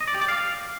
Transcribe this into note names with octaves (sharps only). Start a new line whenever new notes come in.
D#5
D5
G4
D5
F5